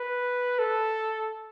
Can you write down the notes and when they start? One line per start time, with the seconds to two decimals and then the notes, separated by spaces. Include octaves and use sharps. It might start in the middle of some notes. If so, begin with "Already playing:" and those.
Already playing: B4
0.59 A4